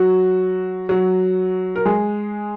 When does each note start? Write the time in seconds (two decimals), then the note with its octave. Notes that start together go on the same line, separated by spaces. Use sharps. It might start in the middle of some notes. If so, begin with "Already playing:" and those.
Already playing: F#3 F#4
0.89 F#3 F#4
1.76 A#4
1.85 G#3 G#4